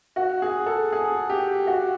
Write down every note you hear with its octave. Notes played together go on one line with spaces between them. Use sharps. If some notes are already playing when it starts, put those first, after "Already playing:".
F#4
G#4
A4
G#4
G4
F#4